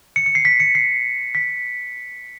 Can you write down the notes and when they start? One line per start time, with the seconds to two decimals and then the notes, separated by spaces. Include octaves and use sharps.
0.16 C#7
0.26 C#7
0.35 C7
0.45 B6
0.60 C#7
0.75 C7
1.35 B6